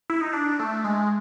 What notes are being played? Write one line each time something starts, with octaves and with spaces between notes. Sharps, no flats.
E4
D#4
D4
A3
G#3